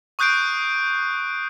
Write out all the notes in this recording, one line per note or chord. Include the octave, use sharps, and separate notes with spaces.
C#6 D#6 F#6 G6 C7 D7